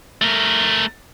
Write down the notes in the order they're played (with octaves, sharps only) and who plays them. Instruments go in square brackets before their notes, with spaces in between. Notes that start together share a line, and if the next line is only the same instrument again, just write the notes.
[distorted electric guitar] A3 A#4